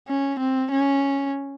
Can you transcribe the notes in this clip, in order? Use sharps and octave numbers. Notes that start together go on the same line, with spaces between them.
C#4
C4
C#4